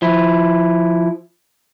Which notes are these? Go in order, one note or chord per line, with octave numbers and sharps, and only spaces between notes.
F3 E4